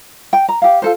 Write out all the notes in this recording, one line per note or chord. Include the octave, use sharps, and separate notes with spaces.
G5
A#5
G4 F5
F4 A4 C5